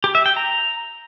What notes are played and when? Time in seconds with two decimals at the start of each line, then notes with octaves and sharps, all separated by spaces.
0.04 G4
0.15 E5
0.26 G5
0.36 A#5